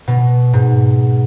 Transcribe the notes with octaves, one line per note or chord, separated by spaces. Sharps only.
B2
G#2